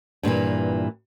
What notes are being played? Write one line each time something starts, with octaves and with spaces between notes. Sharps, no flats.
G2 A#2 D#3 E3